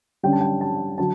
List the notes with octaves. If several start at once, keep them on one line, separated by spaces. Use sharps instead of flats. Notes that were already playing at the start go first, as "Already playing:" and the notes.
D3 G3 C#4 G5
A5
G5
A5
D3 F#3 A5